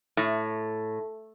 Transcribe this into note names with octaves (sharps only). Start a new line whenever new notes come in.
A2